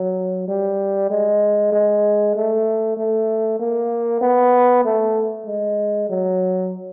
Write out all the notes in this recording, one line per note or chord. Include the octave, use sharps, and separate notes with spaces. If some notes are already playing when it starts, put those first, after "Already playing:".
Already playing: F#3
G3
G#3
G#3
A3
A3
A#3
B3
A3
G#3
F#3